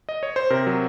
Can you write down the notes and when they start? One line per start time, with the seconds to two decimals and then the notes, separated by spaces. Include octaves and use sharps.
0.09 D#5
0.23 C#5
0.36 C5
0.50 C3 A#4
0.67 F#3